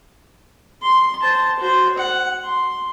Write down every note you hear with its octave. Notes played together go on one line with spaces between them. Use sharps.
C6
C5 A5
F#4 C5
F#5
C6